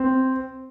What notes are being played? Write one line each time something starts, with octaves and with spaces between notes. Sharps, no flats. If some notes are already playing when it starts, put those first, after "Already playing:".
Already playing: C4